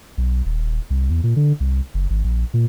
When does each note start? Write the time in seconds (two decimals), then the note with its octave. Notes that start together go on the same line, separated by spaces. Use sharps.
0.18 B1
0.46 D#1
0.90 C2
1.10 E2
1.23 A#2
1.36 D3
1.60 C2
1.94 F#1
2.10 G#1
2.24 A#1
2.54 A#2